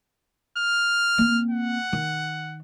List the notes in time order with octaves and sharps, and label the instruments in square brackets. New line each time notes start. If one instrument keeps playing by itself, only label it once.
[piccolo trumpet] F6
[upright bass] A#3 C4
[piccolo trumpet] F#5
[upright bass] D#3